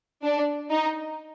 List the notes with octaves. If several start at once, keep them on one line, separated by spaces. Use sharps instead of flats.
D4
D#4